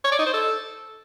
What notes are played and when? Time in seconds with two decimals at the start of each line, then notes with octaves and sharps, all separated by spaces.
0.05 C#5
0.12 D5
0.19 D#4
0.26 C5
0.34 A4